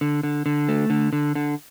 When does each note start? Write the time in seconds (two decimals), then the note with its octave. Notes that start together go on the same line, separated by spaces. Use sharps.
0.01 D3
0.23 D3
0.46 D3
0.69 A3
0.90 D3
1.13 D3
1.35 D3